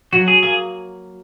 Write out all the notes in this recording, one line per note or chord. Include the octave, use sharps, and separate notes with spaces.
F#3 F#4
G#4
A#3 G#4